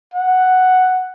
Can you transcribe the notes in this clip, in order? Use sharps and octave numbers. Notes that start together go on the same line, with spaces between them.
F#5